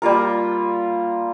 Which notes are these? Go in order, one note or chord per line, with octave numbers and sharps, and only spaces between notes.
G3 A#3 F4 A#4